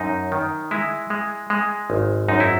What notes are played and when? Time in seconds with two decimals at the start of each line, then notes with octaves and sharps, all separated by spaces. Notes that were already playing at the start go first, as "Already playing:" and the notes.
Already playing: F#2 D#4
0.32 D#3
0.71 G#3 E4
1.10 G#3
1.50 G#3
1.90 G#1
2.28 F#2 D#4
2.40 E4